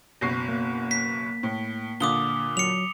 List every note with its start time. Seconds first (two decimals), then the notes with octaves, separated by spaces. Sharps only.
0.21 F#1 B2 C#6 A#6 C7
0.49 A#3
0.91 B6
1.43 A2
2.00 A#2 D3 F4 D6 D#6 G7
2.57 F#3 C#7 F7